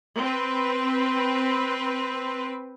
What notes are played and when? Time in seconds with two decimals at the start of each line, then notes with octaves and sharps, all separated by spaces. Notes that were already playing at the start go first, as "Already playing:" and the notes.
0.20 C4 B4